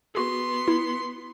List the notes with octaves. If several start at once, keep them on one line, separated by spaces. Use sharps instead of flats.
B3 F#4 G#4 C6
E4